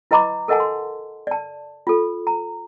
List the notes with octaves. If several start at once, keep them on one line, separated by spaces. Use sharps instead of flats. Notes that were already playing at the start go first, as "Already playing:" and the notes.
E4 B4 D#5 A#5 B5 D6
A4 A#4 D#5 F#5 G#5 A5
C6
D5 A5
F4 A4
A#5